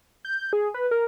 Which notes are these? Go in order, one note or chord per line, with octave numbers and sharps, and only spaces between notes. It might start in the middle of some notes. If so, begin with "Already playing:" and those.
G6
G#4
B4
A#4